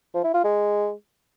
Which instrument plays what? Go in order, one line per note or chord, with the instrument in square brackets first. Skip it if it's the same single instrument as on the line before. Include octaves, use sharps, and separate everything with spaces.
[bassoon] F3
E4
F4
G#3